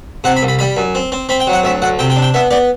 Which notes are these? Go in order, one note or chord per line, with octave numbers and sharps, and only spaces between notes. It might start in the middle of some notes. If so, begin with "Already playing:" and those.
C3 F#5
B5
C2
B5
G3 B5
F#2
C4
C4
C4 B5
G5
F#3
F#5
D2 E5
D2 F#5
C3 G5
G5
D4
G5
B3 E5
B3 D5